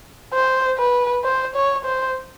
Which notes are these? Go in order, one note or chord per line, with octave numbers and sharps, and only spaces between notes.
C5
B4
C5
C#5
C5